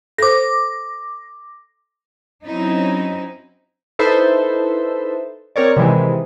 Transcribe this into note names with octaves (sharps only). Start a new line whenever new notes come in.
A4 C5 D6 A#6
F#3 C4 C#4 D#4 E4
D#4 E4 A4 B4 C5 E5
C4 A#4 C#5 D5
C3 D#3 E3 G#3